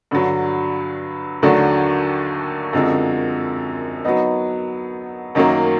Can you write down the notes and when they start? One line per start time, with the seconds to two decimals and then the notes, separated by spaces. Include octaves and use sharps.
0.11 G2 D3 F#3
1.42 D#2 D3 F#3 A3 D4
2.73 F#2 D3 F3 G#3 C4
4.04 F#3 B3 D#4
5.35 F#2 D#3 F#3 A#3